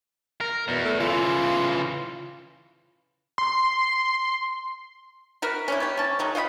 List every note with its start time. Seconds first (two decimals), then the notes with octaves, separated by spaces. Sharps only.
0.41 A#4
0.68 E2 B2
0.85 A3
1.00 C#3 E3 F4
3.38 C6
5.42 F#4 A#4 B4
5.68 C#4 D4 E4
5.80 B3 G4
5.97 C#4 A5
6.19 D#3 F#3 G#3
6.35 F4 D#5 F#5 B5